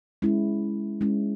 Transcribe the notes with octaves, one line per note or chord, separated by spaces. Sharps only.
G#3 C#4 E4
G#3 C#4 E4